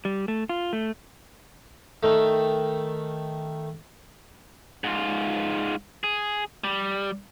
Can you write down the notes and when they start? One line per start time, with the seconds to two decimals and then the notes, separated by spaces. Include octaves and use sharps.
0.05 G3
0.28 A3
0.49 F4
0.73 A3
2.03 D#3 A3
4.84 G#2 F4
6.04 G#4
6.64 G3